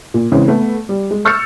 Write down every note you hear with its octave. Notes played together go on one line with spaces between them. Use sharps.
A#2
C#3 E3 G#3 C4
A3 B3
G3
G#3
C#6 E6 F6 G6 A6 C#7